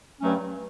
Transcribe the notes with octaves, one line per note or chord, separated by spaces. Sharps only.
G2 F#3 A3 C#4